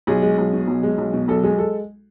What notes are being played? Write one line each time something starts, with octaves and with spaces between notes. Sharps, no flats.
B1 G#4
G#3
B1
B2
B1
G#3
B1
B2
B1 A4
G#3 G#4
A4